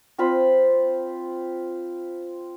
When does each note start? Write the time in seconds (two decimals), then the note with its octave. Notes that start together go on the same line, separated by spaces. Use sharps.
0.18 C4 F4 C5 B5